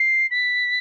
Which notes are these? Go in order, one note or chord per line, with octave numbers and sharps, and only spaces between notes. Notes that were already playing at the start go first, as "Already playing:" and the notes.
Already playing: C7
B6